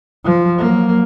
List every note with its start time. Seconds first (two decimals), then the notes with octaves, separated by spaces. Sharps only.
0.25 F3
0.58 F#3 A#3